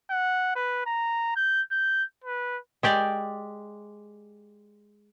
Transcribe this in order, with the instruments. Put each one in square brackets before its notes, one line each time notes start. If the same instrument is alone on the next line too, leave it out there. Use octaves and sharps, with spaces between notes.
[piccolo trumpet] F#5
B4
A#5
G6
G6
B4
[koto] G#3 G4 D5